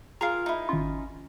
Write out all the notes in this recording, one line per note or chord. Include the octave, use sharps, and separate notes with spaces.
F4 G#4 A#4 F5 A#5
D#4 E4
G#1 C#4 F4